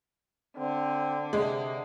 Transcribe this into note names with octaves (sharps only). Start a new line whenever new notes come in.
D3 C4
C3 G#3